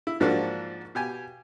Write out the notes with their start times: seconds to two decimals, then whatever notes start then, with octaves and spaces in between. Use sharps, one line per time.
0.07 E4
0.20 G#2 F3 A#3 D4 F#4
0.95 B2 G4 G#5